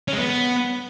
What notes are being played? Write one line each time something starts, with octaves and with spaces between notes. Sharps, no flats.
C#4
G#3
B3